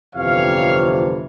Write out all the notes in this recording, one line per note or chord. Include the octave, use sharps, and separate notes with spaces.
G1 F2 C3 E3 C#5 F5